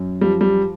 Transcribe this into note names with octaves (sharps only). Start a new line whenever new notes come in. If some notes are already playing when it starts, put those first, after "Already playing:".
Already playing: F#2
F3 G3
G3